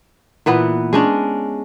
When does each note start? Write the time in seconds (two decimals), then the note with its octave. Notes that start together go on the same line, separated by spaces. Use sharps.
0.46 A#2 E3 B3
0.93 G#3 C#4 D4